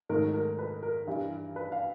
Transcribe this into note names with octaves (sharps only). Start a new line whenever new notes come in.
G#2 D#3 F#3 A3 A#4
A#4
B4
A#4
G2 E3 G3
B4
F5